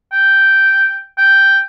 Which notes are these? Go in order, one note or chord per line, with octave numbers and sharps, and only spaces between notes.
G5
G5